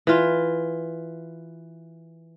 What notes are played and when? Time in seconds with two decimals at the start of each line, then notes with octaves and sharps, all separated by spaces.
0.07 E3 F4